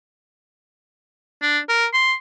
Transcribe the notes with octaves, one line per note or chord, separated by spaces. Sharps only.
D4
A#4
C6